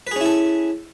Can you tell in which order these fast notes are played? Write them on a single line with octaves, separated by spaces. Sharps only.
B4 G#4 C#4 E4 A4